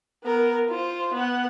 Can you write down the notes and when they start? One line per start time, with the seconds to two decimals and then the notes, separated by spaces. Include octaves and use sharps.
0.24 B3 A#4
0.69 F4 C5
1.13 B3 F#5